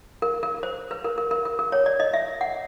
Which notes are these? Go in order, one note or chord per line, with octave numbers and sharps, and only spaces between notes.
A#4
A#4
C5
B4
A#4
A#4
A#4
A#4
A#4
C#5
D5
D#5
E5
F#5